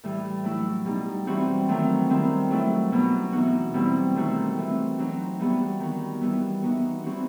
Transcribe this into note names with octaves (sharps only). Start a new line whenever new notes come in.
A2 E3 G3
F#3 A3 E4
B2 G3 D#4
E3 G3 C4 F#4
D#3 F#3 A3 C4
D#3 G3 C4 E4
F#3 A3 E4
B2 F#3 B3 D#4
E3 B3 D#4 F#4
B2 G3 C4 E4
D#3 A3 C4 D#4 F#4
E3 A3 C4
F#3 C4 D#4 F#4
E3 G3 B3 F#4
D#3 G3 D#4 F#4
E3 G3 B3 E4
E3 B3 D#4 F#4
E3 G3 C4 D#4 F#4